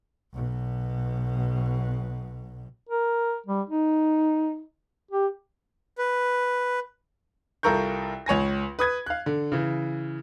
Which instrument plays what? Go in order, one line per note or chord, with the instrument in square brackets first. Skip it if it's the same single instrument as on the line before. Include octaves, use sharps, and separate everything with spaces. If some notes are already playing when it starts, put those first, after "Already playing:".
[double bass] B1 B2
[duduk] A#4
G3
D#4
G4
[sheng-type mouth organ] B4
[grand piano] C2 F4 A4 A#4 C#6 G6
C#2 C#5 G#5 A#6
B4 D#6 G#6
F5 F#6
D3
C#3 E3